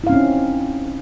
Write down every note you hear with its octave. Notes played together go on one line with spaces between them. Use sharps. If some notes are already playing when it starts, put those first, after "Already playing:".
C4 C#4 D#4 E4 F5